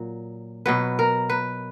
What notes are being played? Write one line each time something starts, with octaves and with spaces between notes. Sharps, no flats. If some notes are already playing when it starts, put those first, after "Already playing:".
Already playing: A#2 F#3
B2 F#3 B4
A#4
B4